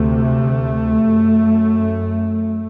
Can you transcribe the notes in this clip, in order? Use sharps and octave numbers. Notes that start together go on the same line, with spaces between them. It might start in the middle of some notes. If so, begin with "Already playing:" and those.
Already playing: D2 C3 A3
F#2